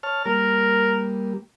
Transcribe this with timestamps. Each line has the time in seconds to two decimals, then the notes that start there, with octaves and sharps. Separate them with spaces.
0.03 C#5 A5 F6
0.26 G3 A#3 A#4